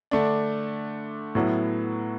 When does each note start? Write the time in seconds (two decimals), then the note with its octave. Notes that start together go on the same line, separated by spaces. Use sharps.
0.11 D3 A3 D4
1.35 A2 F#3 B3 E4